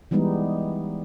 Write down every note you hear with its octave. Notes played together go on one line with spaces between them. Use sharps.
E3 G3 G#3 B3 D#4